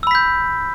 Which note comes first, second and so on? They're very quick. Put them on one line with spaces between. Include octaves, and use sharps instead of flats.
E6 B5 B6 G6